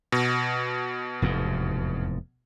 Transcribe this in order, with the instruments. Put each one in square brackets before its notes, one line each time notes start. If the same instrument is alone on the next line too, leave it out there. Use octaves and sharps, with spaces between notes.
[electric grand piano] B2
[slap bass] F1 E2 G#2